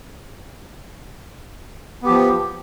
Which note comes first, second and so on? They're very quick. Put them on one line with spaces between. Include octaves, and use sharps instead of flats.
B3 G4 F3